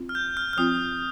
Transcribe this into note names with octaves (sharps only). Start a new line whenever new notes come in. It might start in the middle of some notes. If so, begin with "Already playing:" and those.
Already playing: C4 F4
F6
G6
F6
F6
F3 C4 F4 D#6